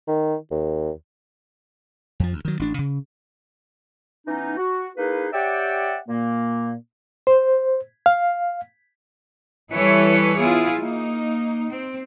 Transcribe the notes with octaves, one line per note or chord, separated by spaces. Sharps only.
D#3
D#2
F2 F3
D2
D#3 F#3
A1 D4
C#3
E3 B3 C#4 D#4
F#4
A#3 D#4 E4 G#4 B4
G4 C#5 D5 E5 F#5 G5
A#2 A#3
C5
F5
E3 G3 E4 A4 B4 C#5
B3 E4 F4 G#4
A#3 D#4
C4